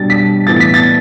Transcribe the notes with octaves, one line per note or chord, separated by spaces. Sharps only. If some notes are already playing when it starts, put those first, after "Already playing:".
Already playing: B2 G3 D4 A6
B6
A2 E3 B3 A6
B6
A6